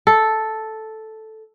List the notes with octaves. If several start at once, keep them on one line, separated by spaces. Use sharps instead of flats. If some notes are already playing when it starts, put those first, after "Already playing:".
A4